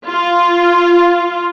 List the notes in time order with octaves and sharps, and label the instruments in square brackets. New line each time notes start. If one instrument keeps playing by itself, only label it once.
[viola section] F4